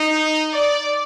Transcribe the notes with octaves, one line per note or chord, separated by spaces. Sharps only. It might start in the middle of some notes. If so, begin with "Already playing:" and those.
Already playing: D#4
D5